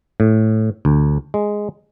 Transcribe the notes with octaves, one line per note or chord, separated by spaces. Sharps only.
A2
D2
G#3